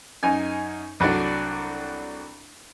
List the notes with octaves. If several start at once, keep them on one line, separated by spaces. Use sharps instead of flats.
F#2 D#4 G#5
C2 F#3 A3 D4 D5